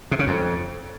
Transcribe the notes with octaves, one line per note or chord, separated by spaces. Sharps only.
C3
C#3
F2